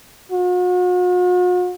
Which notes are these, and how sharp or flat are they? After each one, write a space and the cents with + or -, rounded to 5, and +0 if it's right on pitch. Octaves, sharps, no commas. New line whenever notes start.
F#4 -45